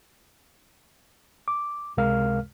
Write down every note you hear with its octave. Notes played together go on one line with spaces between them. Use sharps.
D6
C#2 C3 G#3 A#4 F5 F6